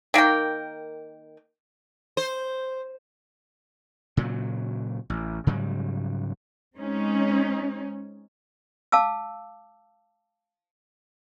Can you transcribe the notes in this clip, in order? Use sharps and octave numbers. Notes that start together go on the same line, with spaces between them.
D#3 A#3 A#4 G5
C5
A#2 C#3 F#3
A1
G#2 C#3 F#3 G3
G#3 C4 C#4 D#4
F5 A5 D6 E6